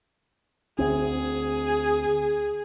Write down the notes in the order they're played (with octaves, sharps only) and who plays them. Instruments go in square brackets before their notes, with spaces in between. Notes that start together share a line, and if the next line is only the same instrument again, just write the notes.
[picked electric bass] D2 C4 [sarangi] G#4